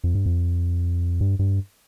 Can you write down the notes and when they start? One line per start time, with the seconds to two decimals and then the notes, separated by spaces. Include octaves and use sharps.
0.04 F2
0.15 G2
0.26 F2
1.21 G2
1.39 G2